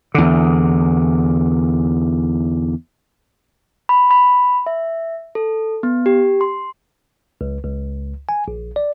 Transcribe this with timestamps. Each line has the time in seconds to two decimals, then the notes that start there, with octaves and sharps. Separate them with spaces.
0.14 E2 D3
3.89 B5
4.11 B5
4.66 E5
5.35 A4
5.83 B3
6.06 G4
6.41 C6
7.41 C#2
7.64 C#2
8.29 G#5
8.48 A#1
8.76 D5